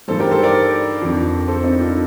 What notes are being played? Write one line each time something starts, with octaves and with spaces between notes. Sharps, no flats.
G2 D#3 G3 A4 C5
G4 A#4
A4 C5
A#4 D5
F2 D3 F3
A4 C5
C4 D#4
D4 F4